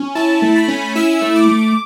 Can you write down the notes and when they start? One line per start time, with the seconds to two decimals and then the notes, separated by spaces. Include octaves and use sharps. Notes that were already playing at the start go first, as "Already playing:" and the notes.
Already playing: C#4
0.15 E4 A5
0.42 A3
0.56 B5
0.68 C#4
0.95 E4 E6
1.21 A3
1.36 D6
1.48 A3